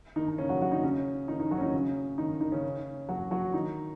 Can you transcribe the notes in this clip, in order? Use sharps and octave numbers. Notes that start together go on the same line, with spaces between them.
D#3 D#4
D#4
C#3 C#4
F#3 F#4
F#3 F#4
D#3 D#4
C#3 C#4
D#3 D#4
D#3 D#4
F#3 F#4
C#4
D#3 D#4
C#3 C#4
D#3 D#4
D#3 D#4
C#3 C#4
F#3 F#4
F#3 F#4
D#3 D#4